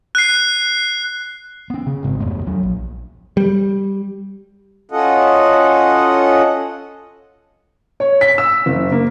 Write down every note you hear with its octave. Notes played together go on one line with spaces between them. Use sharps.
F#6 C7
B3 C#4
C#3
G#1 G#2 C4
D1 F2 A3 B3
D#2 F#3
A#1
G3
C#4 F4 F#4 A4 D#5 F#5
C#5
B6
E6
F#1
A#3